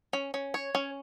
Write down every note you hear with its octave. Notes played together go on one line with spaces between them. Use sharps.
C#4
C#4
C#5
C#4